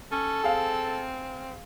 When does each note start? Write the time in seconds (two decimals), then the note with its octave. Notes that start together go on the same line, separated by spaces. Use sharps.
0.12 C#4 A4
0.44 C4 G#4 F5